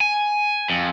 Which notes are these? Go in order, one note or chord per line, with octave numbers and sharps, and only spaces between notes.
G#5
F2